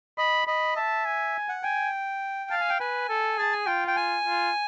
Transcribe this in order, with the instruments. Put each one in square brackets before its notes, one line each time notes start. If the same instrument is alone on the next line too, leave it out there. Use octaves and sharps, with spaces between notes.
[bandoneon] D#5 [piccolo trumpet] B5
[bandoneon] D#5 [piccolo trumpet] B5
[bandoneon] E5 [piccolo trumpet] A5
[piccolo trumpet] G#5
[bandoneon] F#5
[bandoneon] G5 [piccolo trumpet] G#5
[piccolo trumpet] F5 [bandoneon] A5
[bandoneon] G#5
G5
[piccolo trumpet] B4 [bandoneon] G#5
[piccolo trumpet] A4
[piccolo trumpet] G#4 [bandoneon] A5
[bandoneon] G#5
[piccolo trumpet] F4 [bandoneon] G5
[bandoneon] G5
G#5
[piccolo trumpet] F4